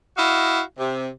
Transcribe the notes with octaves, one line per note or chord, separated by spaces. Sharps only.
E4 F#4 D#5 F5
C3